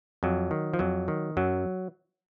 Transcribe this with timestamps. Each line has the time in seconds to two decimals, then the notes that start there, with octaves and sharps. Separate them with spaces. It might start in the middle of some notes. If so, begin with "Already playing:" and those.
0.23 F2 F#3
0.51 D#3
0.74 F3
0.79 F2 F#3
1.08 D#3
1.37 F#2 F#3